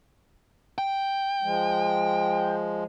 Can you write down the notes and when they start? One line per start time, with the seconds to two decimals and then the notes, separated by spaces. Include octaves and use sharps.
0.78 G5
1.43 F3 G#3